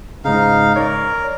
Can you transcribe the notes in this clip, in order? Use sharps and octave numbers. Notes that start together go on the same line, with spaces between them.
G#2 C#3 D#4 F5
A#4 C#5 D5